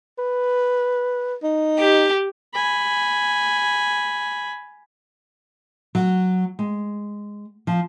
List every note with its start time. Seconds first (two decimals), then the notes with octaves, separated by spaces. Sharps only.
0.18 B4
1.43 D#4
1.79 G4
2.54 G#5 B5
5.95 F#3
6.59 G#3
7.67 F3